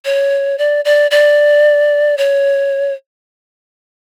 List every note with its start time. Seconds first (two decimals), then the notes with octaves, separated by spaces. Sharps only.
0.05 C#5
0.58 D5
0.85 D5
1.11 D5
2.17 C#5